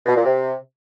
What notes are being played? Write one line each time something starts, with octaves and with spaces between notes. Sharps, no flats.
B2
A#2
C3